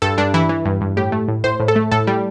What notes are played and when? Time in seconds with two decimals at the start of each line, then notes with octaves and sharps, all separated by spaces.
0.02 G2 A4
0.18 G2 D4
0.34 E3 E4
0.49 E3
0.65 G2
0.81 G2
0.97 A2 G4
1.12 A3
1.28 A2
1.44 A2 C5
1.60 A2
1.68 A4
1.76 A3
1.91 A2 A4
2.07 G3